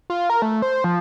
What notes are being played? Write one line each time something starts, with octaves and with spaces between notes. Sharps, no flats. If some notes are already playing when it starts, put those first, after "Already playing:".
F4
A#4
A3
C5
F3